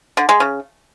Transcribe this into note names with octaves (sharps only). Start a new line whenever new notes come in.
D3
G#3
C#3